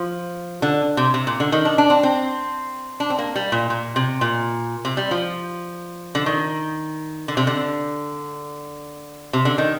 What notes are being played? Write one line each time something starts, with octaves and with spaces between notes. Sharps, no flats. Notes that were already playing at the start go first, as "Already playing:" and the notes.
Already playing: F3
D3
C3
C3
A#2
D3
D#3
D4
D4
C4
C4
D4
C4
A#3
G3
A#2
A#2
C3
A#2
C3
G3
F3
D3
D#3
D3
C3
D3
C3
D3
D#3